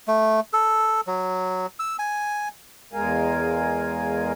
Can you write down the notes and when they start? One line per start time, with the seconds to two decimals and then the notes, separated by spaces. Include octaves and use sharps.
0.08 A3
0.53 A4
1.07 F#3
1.79 E6
1.99 G#5
2.93 E2 G#3 A#4 F5 G#5